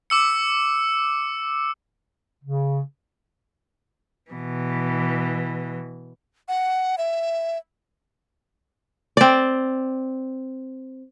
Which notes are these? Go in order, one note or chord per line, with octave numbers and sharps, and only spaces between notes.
D6 E6 C#7
C#3
B2 E3
F#5
E5
C4 D5